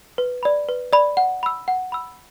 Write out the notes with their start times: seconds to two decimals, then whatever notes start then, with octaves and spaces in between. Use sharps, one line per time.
0.18 B4
0.43 D5 B5
0.69 B4
0.93 D5 B5
1.17 F#5
1.43 B5 E6
1.68 F#5
1.92 B5 E6